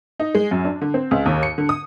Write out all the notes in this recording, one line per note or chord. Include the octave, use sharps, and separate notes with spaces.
D#4
G#3
F#2
D4
D3
C4
C#2
D#2
C#7
D3
D#6